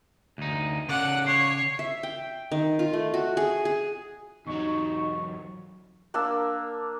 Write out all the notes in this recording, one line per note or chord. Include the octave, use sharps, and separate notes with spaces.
D2 D#4
C#3 D5 F#5
C#5 C7
E5
G5
D#3
F4
A3
F#4
G#4
G#4
E2 F#3 D#4 C#6
A#3 D4 A#4 E6